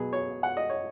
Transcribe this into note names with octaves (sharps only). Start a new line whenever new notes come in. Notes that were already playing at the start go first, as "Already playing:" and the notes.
Already playing: B2 F#3 B3 G#4
C#5
F#5
D#5
C#5